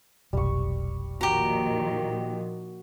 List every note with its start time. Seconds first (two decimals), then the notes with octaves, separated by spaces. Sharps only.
0.33 F1 B1 G3 C#6
1.21 A#2 D#3 F3 F#4 G4 A#5